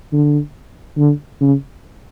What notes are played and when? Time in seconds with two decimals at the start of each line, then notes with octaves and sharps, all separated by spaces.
0.13 D3
0.98 D3
1.41 C#3